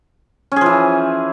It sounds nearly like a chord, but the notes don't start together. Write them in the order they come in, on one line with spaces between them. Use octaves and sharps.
C#4 G#4 F3 E3